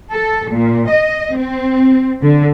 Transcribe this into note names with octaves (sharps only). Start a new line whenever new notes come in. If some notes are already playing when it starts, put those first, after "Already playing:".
A4
A#2
D#5
C4
D3